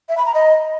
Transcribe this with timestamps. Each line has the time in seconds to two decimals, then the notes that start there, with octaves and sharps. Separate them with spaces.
0.09 E5
0.17 B5
0.26 A#5
0.34 D#5